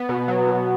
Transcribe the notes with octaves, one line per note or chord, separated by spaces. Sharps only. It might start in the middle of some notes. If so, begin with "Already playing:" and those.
Already playing: B3
B2
F#3
B2